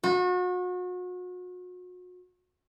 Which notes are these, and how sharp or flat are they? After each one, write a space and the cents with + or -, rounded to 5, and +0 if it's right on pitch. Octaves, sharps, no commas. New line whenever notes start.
F#4 -35